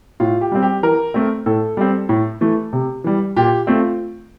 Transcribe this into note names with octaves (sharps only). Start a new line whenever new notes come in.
A2 F4
G4
G3 C4
G4
E3 A#4
A3 C4
A2 A4
G3 C4
A2
E3 A3
C3
E3 G3
A#2 G4
A3 C4 F4